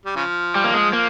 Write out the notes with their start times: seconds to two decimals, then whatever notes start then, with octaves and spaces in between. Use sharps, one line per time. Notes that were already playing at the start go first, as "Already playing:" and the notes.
0.05 G3
0.16 C#3 F3
0.55 G3
0.64 A#3
0.74 G#3
0.93 A#3